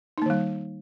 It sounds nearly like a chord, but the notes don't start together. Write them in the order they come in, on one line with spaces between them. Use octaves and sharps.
D#4 A#3 D#3 G3